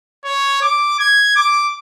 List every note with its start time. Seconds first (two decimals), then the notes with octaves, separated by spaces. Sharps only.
0.24 C#5
0.62 D6
0.99 G#6
1.36 D6